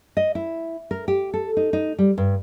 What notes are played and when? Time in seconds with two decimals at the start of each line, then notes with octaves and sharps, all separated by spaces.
0.17 D#5
0.35 E4
0.91 A#4
1.08 G4
1.34 A4
1.57 D#4
1.73 D#4
1.99 G3
2.18 G2